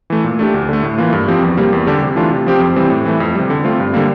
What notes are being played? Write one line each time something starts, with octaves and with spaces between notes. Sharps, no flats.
E3 A3
A#2
A3 D4 G4
D2
D3 A3
A2
E3 A#3 F4
G2
F3 C4 G4
E2
C3 G3 A#3
E2
D3 G3 D4 G4
C3
E3 A3 D4 F4
C3
F3 C4 G4
F2
E3 G3 C4
A2
E3 A3
F2
C3 G3
D3
A3 C4 F4
G2
D3 G3 A#3